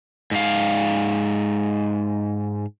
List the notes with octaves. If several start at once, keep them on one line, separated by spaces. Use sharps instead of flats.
G#2 F5